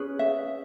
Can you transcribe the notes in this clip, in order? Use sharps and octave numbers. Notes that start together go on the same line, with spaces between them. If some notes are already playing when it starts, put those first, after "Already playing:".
Already playing: C#4 G#4 B4
E5